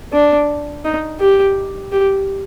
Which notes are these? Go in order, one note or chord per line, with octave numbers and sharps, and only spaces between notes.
D4
D#4
G4
G4